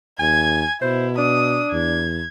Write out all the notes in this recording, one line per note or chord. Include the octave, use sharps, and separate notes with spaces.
D#2 G#5 G#6
B2 E4 C5
D4 D#6
E2 G#6